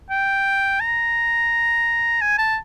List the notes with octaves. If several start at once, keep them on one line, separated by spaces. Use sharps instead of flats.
G5
A#5
G#5
A5